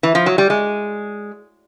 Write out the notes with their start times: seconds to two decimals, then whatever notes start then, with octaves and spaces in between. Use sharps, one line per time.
0.03 E3
0.15 F3
0.26 F#3
0.38 G3
0.50 G#3